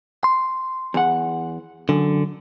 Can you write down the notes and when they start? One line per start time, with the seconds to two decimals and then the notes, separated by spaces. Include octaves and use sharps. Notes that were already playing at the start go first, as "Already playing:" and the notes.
0.24 C6
0.94 E2 F#5
1.89 F#2 D3